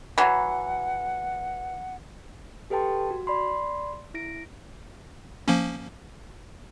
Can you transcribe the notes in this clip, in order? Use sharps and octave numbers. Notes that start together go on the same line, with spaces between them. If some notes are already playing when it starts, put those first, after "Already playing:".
E3 F#3 F#5
G4 A4 B4 G5 A5 C6
F#4
D5 B5 C6
E4 A#6 D7
F3 A#3 C#4